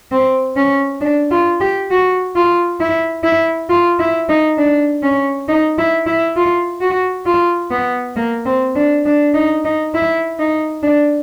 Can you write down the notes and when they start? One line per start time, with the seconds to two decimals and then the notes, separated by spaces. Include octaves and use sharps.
0.12 C4
0.56 C#4
1.01 D4
1.31 F4
1.60 G4
1.91 F#4
2.36 F4
2.80 E4
3.24 E4
3.69 F4
3.99 E4
4.29 D#4
4.58 D4
5.03 C#4
5.48 D#4
5.78 E4
6.07 E4
6.36 F4
6.81 F#4
7.26 F4
7.71 B3
8.16 A#3
8.46 C4
8.76 D4
9.06 D4
9.34 D#4
9.65 D#4
9.94 E4
10.39 D#4
10.83 D4